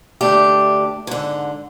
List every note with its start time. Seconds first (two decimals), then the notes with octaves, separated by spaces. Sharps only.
0.21 D2 A3 D4 G4
1.07 G#2 D3